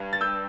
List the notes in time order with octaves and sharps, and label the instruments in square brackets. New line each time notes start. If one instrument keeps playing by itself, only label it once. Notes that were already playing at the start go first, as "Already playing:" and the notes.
Already playing: [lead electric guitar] G2
[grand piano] A6
E6 G6